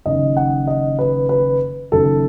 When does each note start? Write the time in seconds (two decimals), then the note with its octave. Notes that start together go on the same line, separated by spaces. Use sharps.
0.06 F#1 F#2 D#3 D#5
0.37 F#5
0.67 D#5
0.99 B4
1.29 B4
1.92 F#1 F#2 D#3 F#3 A4